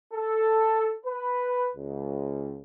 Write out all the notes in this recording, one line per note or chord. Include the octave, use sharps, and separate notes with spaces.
A4
B4
C#2